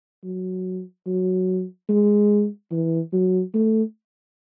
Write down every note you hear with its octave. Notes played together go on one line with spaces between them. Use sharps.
F#3
F#3
G#3
E3
F#3
A3